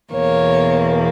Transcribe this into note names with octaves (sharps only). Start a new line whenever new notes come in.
E2 B2 A#3 C#5